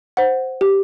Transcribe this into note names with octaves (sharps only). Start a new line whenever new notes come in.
C5 F#5
G4